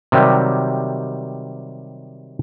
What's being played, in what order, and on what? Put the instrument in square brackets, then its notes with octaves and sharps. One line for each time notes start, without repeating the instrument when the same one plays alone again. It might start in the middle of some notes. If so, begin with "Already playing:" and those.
[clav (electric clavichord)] C3 D#3 F#3 G3